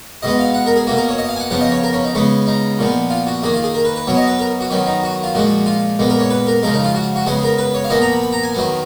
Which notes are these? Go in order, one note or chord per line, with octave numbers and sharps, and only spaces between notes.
B2 G#3 B3 D#5
F5
F#5
A#4
G#4
B2 A#3 F#4
A#4
C#5
D#5
F5
G#5
F#5
C#3 F3 B3 F#5
D#5
C#5
A#4
C#4
D#4
C#3 G#3 B3 C#4
D#4
A#2 F3 B3
F4
F#4
D#3 A#3 G#4
F4
G#4
A#4
B4
B4
B2 F#3 B3 C#5
D#5
B4
A#4
F#4
D#3 F#3 B3 C#4
D#4
F#4
F4
A#2 F3 G#3 F#4
F4
A#2 G#3 B3
A#4
C#5
B4
A#4
C#3 F3 G#3 A#4
D#4
F4
F#4
F#4
C#3 G#3 B3 G#4
A#4
B4
C#5
F5
A#2 F3 B3 D#5
A#5
B5
B5
A#5
G#5
D#3 F#3 B3